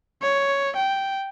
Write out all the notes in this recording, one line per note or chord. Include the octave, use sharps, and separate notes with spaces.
C#5
G5